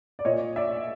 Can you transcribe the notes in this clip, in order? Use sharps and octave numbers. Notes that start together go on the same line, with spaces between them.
D5
A#2 C#5 D#5
D5 E5